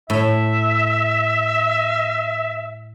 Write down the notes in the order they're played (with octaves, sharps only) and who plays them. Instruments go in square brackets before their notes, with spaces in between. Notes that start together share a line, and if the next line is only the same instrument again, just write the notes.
[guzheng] A2 [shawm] E5